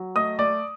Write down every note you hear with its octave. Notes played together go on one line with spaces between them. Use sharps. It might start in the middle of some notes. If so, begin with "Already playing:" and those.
Already playing: F#3
A3 D#5 D#6
A3 D5 D6